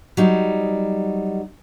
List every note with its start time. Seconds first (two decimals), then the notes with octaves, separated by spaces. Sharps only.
0.17 F#3 G3 D#4